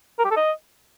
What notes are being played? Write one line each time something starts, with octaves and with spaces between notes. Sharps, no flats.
A#4
G4
A4
D#5